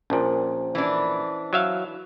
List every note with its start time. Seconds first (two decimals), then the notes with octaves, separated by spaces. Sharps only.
0.10 A#1 A#2 C#4 C5
0.75 E3 D4
1.53 F#3 E5 F5